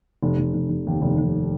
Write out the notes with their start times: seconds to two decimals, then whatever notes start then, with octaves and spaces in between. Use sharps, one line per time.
0.23 F1
0.38 F1
0.54 F1
0.70 F1
0.87 D#2
1.02 F1
1.18 F1